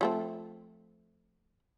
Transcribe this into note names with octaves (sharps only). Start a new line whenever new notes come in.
F3 A3 C4